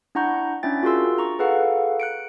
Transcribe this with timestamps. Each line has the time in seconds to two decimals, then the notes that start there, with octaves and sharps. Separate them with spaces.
0.15 D4 E4 F#5 A#5 C#6 G6
0.63 C#4 D4 E4 E5 G5 A6
0.83 F4 F#4 G#4 A#4 C6 E6
1.18 A#5 C#6
1.39 G#4 A4 B4 F5 F#5
2.00 F#6 C#7 D7